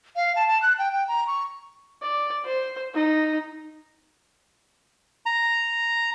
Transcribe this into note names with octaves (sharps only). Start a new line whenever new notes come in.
F5
A5
A5
F#6
G5
G5
A#5
C#6
D5
C5
D#4
A#5